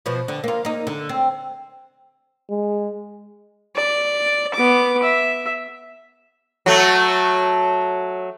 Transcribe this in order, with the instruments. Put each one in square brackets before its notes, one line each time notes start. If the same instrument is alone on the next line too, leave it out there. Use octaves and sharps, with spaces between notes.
[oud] B2 F3
D3
A#3 F4
A#3 D#4
D3
C4
[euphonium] G#3
[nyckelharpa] D5
B3 D6
E5
[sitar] F#3 A3